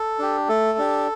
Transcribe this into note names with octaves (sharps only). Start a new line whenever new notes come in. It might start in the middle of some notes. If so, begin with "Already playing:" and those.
Already playing: A4
D4 G4
A3 A4
D4 G4